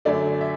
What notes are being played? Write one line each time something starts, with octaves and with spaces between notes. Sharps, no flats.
F#2 D3 F#3 A3 D5
E5